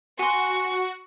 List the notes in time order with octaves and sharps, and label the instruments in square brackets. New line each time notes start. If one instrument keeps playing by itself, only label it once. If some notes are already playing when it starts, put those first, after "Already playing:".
[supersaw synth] F#4 [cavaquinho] G#5 C6 [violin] C#6